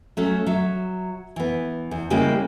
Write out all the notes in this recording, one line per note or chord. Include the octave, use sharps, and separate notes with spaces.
F#3 A3 C#4
F#3 E5
E3 B3
E2
C#3 G3 G#3 A#3 E4 G4